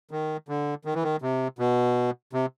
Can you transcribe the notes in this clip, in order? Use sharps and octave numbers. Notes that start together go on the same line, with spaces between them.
D#3
D3
D#3
E3
D#3
C3
B2
C3